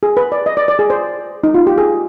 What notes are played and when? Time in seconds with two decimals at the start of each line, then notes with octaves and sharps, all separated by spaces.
0.03 G#4
0.17 B4
0.32 D5
0.46 D#5
0.57 D5
0.68 D5
0.79 G#4
0.90 C5
1.44 D#4
1.54 F4
1.67 G4
1.78 G#4